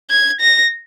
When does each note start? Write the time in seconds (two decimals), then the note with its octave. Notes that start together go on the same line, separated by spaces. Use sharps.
0.10 G#6
0.41 A#6